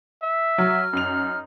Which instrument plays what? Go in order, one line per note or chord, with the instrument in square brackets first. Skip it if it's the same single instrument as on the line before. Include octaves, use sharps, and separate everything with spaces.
[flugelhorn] E5
[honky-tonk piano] F#3 [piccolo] F6
[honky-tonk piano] F#2 F7 [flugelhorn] D#4